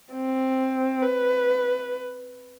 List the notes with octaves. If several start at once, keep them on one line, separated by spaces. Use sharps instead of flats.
C4
B4